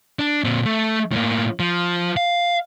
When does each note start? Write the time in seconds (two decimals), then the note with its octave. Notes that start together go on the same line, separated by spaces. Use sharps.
0.19 D4
0.44 A#2 C4
0.66 A3
1.12 A2 A#3
1.60 F3
2.17 F5